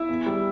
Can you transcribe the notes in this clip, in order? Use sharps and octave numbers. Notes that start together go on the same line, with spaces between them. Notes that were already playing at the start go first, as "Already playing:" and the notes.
Already playing: E4 E5
E2
G3